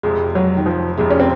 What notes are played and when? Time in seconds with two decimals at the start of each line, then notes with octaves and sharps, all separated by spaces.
0.03 F1 F2 C3 G#3
0.35 F#3
0.57 D#3
0.66 F3
0.97 F1 F2 C3 G#3
1.10 C#4
1.20 C4